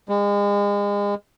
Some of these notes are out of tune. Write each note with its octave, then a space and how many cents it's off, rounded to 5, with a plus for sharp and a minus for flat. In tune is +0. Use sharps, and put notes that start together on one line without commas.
G#3 -35